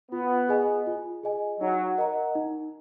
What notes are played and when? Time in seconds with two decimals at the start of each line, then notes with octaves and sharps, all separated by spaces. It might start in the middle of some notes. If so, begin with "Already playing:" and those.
0.11 B3 F4
0.49 G#4 D#5 G#5
0.87 F4
1.23 G#4 D#5 G#5
1.61 F#3 D#4
1.98 A#4 D#5 F#5 A#5
2.35 D#4